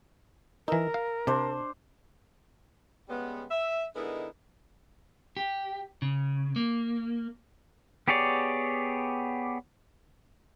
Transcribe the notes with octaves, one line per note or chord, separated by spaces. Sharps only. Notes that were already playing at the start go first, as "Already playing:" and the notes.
E3 D#4 A#4 E6
F5
C3 D4 C5
C#3 G3 G#3 B3
E5
D3 G#3 B3 D#4 E4 A#4
G4
C#3
A#3
B3 G4 G#4 C#5 D5